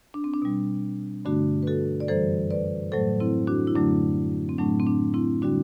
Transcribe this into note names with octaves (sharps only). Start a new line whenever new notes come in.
D4
C4
D4
B2 G3
G2 D3 A3 D4 F#4
B4
F#4 A4
D5
F#2 E3 G3 A4 C5
B4 D5
A2 F#3 A3 A4 C5
C4 E4
D4 F#4
E4
F#2 D3 F#3 A3 D4
C4
A2 F#3 A3 D4
C4
D4
C4 E4
D3 G3 D4 F#4